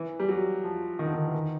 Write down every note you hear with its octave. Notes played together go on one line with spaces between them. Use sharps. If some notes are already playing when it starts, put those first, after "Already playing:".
Already playing: E3
G3
F#3
F3
D#3
D3
D#3
E3
D#3